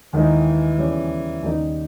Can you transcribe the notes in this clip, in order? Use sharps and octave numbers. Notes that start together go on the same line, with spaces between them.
D#2 D#3 E3 G#3 D#4
E2 C#3 G3 C#4
D#2 C#3 G3 A#3 D#4